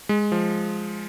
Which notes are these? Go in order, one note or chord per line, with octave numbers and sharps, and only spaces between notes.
G#3
F3